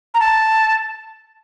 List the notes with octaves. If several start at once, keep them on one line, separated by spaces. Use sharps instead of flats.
A#5
A5